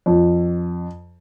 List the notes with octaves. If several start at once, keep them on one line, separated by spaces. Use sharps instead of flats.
F2